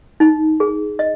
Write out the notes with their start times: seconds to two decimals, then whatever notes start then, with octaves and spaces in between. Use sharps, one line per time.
0.20 D#4
0.60 G#4
0.99 D#5